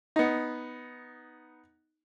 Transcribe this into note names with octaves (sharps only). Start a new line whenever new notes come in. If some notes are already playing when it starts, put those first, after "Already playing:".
B3 D#4